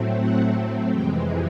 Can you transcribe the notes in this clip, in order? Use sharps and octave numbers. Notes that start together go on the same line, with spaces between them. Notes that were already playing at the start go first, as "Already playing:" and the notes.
Already playing: A2 F#3 A3 C4
F#5
F2 C3 E3 G#3 G5